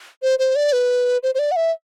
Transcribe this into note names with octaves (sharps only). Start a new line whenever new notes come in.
C5
C5
D5
B4
C5
C5
D5
F#5
E5